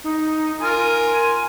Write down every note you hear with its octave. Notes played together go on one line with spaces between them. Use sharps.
D#4
F4 A#4 G#5